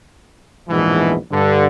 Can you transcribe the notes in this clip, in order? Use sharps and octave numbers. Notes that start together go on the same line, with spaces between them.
A#1 E2 G#2 B2 E3
G2 D3